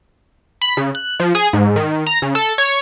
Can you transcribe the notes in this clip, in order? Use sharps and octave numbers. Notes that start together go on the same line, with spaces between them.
B5
C#3
F#6
F3
G#4
G#2
D#3
A#5
C#3
A4
C#5